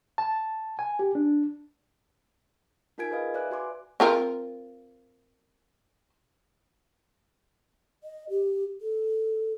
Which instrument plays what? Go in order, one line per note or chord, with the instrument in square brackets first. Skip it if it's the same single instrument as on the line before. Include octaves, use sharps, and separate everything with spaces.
[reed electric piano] A5
G#5
G4
D4
[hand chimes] D#4 F4 A#4 G#5 G#6 D7
G#4 B4 D#5 F5
B4 D5 E5 G#5 F#6
F#4 G#5 C6 D6
[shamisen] C4 F4 A#4
[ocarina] D#5
G4
A4